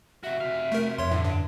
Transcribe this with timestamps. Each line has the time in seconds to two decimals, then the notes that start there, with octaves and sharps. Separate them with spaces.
0.23 C3 F#4 E5
0.41 C3 F#4 F5
0.72 A3 A#4
0.98 F2 C#5 C6
1.11 A2 D3
1.24 G2